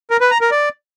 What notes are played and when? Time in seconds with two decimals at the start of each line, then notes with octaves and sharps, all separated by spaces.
0.11 A#4
0.21 B4
0.31 A#5
0.41 A#4
0.51 D5